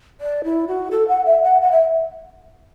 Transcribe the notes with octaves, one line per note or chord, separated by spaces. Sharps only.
D5
E4
F#4
A4
F#5
E5
F#5
F#5
E5